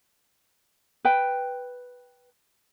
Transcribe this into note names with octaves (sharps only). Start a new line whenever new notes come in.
B4 G5